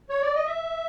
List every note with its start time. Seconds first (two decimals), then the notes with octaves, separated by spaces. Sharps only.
0.10 C#5
0.22 D5
0.34 D#5
0.46 E5